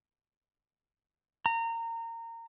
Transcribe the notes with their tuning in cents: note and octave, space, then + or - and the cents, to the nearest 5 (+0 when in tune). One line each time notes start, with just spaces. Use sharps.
A#5 -25